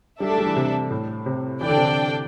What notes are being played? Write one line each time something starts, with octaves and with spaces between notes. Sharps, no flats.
G3 D4 A4 E5
A3
G3
E3
C3
A2
C3
E3 D4 A4 D5 G5
D3
C3
D3